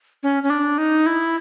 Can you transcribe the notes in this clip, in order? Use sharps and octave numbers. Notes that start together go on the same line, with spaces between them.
C#4
C#4
D4
D#4
E4